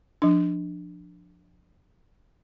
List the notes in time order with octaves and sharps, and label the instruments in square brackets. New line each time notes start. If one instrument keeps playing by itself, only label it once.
[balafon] F3 D4